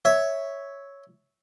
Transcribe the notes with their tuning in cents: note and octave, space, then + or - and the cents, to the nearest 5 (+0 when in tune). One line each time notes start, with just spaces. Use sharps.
C#5 +0 E5 -10